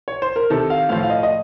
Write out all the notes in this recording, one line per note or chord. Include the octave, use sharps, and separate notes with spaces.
C#5
C5
A#4
C3 D#3 A4
F5
A2 F3 F5
F5
D#5
D#5